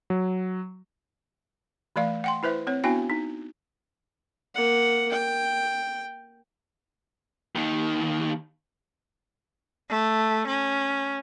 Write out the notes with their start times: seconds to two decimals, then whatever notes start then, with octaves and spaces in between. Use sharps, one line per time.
0.10 F#3
1.96 E3 A3 D5 F5
2.24 F#5 G5 C6
2.43 E4 B4 C5 E5
2.67 C4 C#5
2.84 B3 D4 E4 F#4 G5 G#5
3.10 D#4
4.55 A#3 F#5
5.12 G5
7.55 D#2 D#3
9.90 A3
10.47 C#4